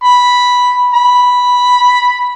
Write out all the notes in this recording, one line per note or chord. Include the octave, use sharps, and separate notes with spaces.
B5
B5